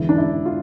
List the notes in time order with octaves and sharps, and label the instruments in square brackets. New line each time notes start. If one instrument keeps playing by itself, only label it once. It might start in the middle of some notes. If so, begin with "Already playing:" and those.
Already playing: [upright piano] E1 E2 D3 E4
D4
E4
F4